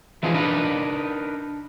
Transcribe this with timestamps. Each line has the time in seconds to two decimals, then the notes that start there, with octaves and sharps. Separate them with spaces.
0.23 E3 F3 C4 D#4 G#4
0.34 D4 D#4 A#4 B4